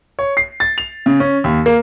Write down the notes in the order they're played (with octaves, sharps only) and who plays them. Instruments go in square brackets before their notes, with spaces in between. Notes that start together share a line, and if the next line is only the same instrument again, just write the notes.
[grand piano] C#5
C7
A6
F7
C#3
C#4
D#2
A#3